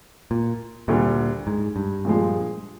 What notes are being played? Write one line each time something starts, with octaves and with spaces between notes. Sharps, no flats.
A#2
D2 A#2 D3 G3
G#2
G2
A#2 F3 G#3